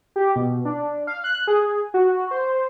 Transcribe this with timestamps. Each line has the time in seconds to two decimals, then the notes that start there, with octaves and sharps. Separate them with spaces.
0.16 G4
0.36 B2
0.65 D4
1.07 F5
1.24 F#6
1.47 G#4
1.94 F#4
2.31 C5